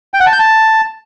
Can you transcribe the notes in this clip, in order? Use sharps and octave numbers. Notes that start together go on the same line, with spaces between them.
G5
F#5
A5
G6
A5